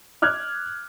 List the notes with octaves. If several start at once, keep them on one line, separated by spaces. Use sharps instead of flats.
D6 F6 F#6 G#6